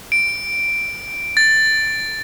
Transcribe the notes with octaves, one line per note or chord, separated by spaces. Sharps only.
D7
A6